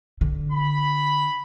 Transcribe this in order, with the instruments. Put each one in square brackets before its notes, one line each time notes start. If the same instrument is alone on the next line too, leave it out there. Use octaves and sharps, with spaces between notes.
[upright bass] D3
[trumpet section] B5